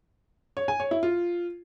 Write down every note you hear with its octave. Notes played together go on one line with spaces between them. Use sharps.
C#5
G#5
C#5
E4
F4